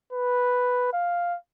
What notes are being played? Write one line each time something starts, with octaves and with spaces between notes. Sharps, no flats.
B4
F5